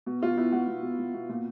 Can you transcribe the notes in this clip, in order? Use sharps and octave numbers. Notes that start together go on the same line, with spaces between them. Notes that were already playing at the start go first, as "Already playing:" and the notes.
B2
B2 F4
B2 E4
B2 F#4
B2
B2
B2
B2
A#2